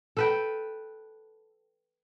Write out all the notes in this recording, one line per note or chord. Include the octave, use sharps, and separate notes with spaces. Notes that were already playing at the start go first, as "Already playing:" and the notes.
A4 B4 G5